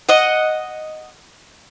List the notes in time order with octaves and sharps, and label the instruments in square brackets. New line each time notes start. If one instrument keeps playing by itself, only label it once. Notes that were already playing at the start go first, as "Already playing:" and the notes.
[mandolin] D#5 F#5